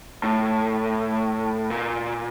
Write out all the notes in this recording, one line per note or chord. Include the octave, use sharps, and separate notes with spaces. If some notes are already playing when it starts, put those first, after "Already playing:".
A2
A#2